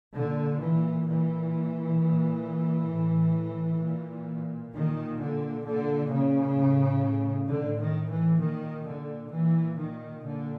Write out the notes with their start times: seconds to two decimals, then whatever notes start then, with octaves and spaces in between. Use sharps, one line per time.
0.15 A#2 D3
0.61 E3
1.07 A#2 E3
1.99 A#2
2.90 A2
3.81 A#2
4.72 A#2 D#3
5.19 D3
5.64 A#2 D3
6.10 C#3
6.56 A2
7.47 A2 D3
7.78 D#3
8.08 E3
8.39 A#2 D#3
8.85 D3
9.30 A#2 E3
9.77 D#3
10.22 A#2 D3